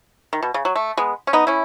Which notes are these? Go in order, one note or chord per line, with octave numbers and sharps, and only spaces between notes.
D#3
B2
C#3
F#3
A3
G#3 B3
C#4
B3 D#4
C#4 E4